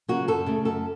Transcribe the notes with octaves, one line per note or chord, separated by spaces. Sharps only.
C#3 F#3 A#3 F#4
F#2 A4
C#3 A3
F#2 A4